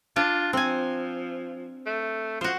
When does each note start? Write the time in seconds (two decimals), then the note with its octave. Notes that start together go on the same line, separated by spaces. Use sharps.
0.16 D4 F4
0.53 F3 C4 G#5
1.86 A3
2.41 F3 F#4 C5